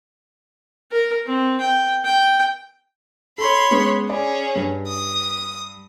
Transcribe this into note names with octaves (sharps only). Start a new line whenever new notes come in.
A#4
C4
G5
G5
A4 C#5 B5 C6
G#3 B3 C#4
C#4 G#4 D5 B5
G2
D#6